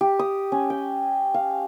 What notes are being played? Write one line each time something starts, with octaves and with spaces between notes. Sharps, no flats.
G4
D#6
C#4
G5
F5